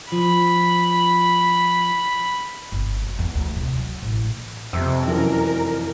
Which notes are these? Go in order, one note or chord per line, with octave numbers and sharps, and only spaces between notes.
F3 B5
G1
F#2
E2
D2
C3
F#3
A1
A#2
F2 C3 E6
F1 F#2 E3 A#4